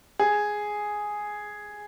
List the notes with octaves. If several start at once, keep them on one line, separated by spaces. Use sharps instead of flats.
G#4